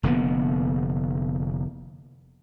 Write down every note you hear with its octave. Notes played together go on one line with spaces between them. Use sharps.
F1 D3 A#3 B3